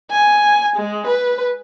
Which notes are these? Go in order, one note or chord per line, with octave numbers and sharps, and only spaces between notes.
G#5
G#3
B4